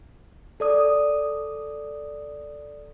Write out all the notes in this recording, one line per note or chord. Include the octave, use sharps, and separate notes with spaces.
A4 D5 D#6